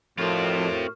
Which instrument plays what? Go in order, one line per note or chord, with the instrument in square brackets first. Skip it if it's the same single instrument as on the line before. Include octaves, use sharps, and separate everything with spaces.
[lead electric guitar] F2 [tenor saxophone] A2 [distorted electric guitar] C4 F4 [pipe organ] F#4 A#4